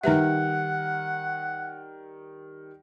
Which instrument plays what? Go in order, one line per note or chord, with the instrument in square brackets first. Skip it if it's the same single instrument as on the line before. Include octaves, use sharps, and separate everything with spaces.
[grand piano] D#3 G3 [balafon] D#4 B4 E5 [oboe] F#5